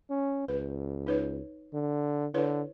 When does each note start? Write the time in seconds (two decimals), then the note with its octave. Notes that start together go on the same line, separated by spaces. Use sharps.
0.10 C#4
0.48 C#2 B4
1.07 D#4 B4 C#5
1.73 D3
2.34 D3 E4 B4 C#5